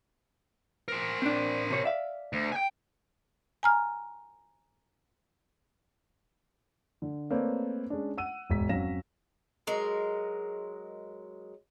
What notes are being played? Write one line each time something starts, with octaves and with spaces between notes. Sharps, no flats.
A#4 C5
C4 D4
C3 C#5
D5 E5 F5
D2
G5 G#5
G#5 A#5 F6
D3
A3 A#3 C4 B4 C#5 D5
G#3 C#4 D4
F#5 E6 D#7
E1 G#2 B6
F2 F#3 C#4 F5 A#6 E7
F#3 G#3 A#4